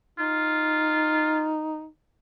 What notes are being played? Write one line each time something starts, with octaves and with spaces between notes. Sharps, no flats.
D#4 F4